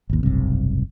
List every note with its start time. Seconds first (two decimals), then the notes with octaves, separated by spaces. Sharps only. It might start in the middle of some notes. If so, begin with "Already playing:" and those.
0.10 G#1 D#2
0.23 F1 B1 G2 C3